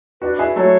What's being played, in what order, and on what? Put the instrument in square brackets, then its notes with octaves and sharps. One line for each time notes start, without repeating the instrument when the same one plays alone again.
[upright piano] D4 F#4 [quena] B4
[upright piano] E4 G#4
[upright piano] F#3 A3 [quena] C#5